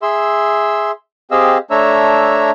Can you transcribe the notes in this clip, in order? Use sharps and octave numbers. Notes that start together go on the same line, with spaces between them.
G#4 E5 C6 E6
C4 G4 G#4 D#5 F5 E6
A3 D4 C#5 E5 A#5 E6